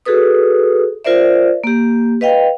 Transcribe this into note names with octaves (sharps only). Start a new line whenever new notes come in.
F#4 G#4 A4 B4 D#6
F4 A#4 C5 D5 E5
A#3 G4
B4 D#5 F5 G5